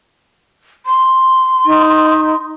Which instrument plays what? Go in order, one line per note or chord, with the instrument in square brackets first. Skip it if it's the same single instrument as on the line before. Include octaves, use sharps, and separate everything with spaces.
[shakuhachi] C6
[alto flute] D#4